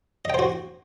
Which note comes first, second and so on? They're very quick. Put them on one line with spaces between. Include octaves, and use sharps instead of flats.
D#5 G5 C5 F#4